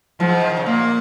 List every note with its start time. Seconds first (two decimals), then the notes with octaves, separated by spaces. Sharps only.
0.19 G#2 F3
0.41 F3
0.50 D#3
0.57 C#3
0.66 A#2 A#3